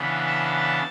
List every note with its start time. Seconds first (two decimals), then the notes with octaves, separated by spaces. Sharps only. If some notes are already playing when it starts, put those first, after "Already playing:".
Already playing: C#3 E3 B3 D4
0.27 A5